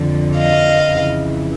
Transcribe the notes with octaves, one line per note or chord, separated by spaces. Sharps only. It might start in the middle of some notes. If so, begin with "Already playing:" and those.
Already playing: F2 D3 F3
D#5 F5
F2 C#3 E3